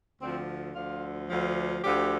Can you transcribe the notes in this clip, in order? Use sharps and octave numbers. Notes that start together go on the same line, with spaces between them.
D2 D3 F3 C4
D2 D3 F3 F4
D2 D3 F3
D2 D3 F3 G4